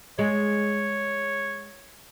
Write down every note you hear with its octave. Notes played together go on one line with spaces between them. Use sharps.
G#3 C#5